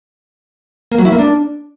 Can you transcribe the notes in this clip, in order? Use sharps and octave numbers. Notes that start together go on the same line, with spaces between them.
A#3
F#3
E4
A#3
D4